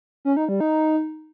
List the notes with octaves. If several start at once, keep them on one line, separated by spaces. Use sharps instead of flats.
C#4
D#4
G3
D#4